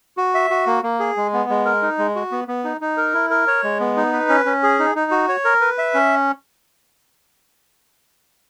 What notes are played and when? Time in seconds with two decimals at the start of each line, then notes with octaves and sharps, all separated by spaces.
0.17 F#4
0.34 E5
0.51 F#4
0.66 A#3
0.83 A#3
1.00 G#4
1.17 G#3
1.33 B3
1.50 G#3
1.65 A#4
1.82 D#4
1.98 G#3
2.15 F#4
2.31 B3
2.48 B3
2.64 D#4
2.81 D#4
2.97 A#4
3.14 E4
3.30 A#4
3.47 C#5
3.63 G#3
3.80 B3
3.97 D#4
4.13 B4
4.29 C#4
4.45 C#4
4.63 G#4
4.79 D#4
4.95 D#4
5.11 F#4
5.29 C#5
5.45 A#4
5.61 B4
5.78 E5
5.94 C#4